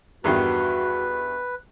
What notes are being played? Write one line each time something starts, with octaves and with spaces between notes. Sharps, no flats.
E2 G2 D#3 F#4 B4